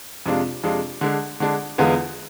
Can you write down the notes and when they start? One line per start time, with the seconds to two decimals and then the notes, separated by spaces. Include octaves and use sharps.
0.26 F2 C3 G#3 D4 F4
0.63 F2 C3 G#3 D4 F4
1.01 D3 G#3 D4
1.40 D3 G#3 D4
1.78 E2 D3 G#3 B3 F4